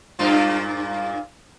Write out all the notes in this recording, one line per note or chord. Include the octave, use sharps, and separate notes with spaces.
G2 A#2 F4